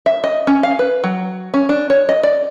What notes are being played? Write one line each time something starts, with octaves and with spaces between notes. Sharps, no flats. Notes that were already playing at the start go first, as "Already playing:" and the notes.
E5
D#5
C#4
F5
B4
F#3
C#4
D4
C#5
D#5
D5